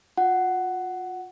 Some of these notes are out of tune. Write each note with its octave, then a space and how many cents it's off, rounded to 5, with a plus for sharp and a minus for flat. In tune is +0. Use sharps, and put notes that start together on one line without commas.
F4 +35 F#5 +10